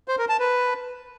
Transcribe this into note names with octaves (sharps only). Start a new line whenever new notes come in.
C5
A#4
A5
B4